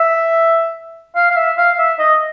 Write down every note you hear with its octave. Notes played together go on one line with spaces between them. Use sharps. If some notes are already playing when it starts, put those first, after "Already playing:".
Already playing: E5
F5
F5
E5
F5
E5
D#5